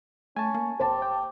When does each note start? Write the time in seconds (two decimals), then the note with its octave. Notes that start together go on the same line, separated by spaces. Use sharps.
0.37 A3 C#4 G#5 A5
0.54 A#3
0.80 F#1 G4 C5 A5
1.02 G5